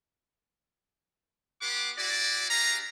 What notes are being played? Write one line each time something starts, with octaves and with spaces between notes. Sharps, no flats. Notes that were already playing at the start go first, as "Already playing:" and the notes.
B3 G4 B4 F#5 C6 D6
E4 F#4 G#4 D5
D4 G4 G#4 F5 A#5